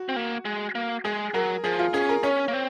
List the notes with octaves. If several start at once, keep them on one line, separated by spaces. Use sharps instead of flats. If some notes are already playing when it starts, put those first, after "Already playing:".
Already playing: F#4
C4
A#3
G#3
A#3
G#3 G#4
F#3 A#4
F3 G#4
F4
C#4 G#4
A#4
C#4 C#5
A#3
C4